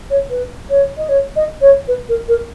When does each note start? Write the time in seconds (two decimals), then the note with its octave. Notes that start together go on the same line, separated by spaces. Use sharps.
0.10 C#5
0.30 B4
0.70 C#5
0.98 D#5
1.09 C#5
1.36 D#5
1.61 C#5
1.88 B4
2.09 A#4
2.29 A#4